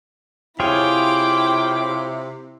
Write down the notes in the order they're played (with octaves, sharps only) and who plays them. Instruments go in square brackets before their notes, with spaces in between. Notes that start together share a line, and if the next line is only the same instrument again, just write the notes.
[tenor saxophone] C3 [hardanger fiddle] E4 D6 [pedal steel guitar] F4 G#4 C#5 [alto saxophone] G5